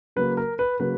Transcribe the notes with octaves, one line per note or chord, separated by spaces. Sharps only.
C#3 F#3 A#3 B4
A#4
B4
C#3 F#3 A#3 B4